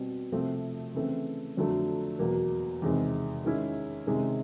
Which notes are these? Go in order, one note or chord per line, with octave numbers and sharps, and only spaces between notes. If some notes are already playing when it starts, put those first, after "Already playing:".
Already playing: B2 G3 C4
C3 F3 A3 C4
C#3 E3 A3 C4
F2 D3 F#3 A3
E2 B2 F#3 A#3
E2 C3 D#3 G#3 C4
D#3 G#3 C#4 E4
C3 D#3 G#3 C#4